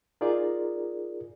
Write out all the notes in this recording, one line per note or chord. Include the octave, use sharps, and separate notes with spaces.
D#4 F4 G#4 A#4 D5